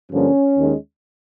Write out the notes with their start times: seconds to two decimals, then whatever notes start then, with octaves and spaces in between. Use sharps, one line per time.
0.11 G2 D3 F3 A#3 C#4
0.57 D#2 D#3 G#3